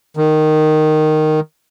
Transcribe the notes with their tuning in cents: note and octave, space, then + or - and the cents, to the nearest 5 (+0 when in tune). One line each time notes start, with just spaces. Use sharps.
D#3 -10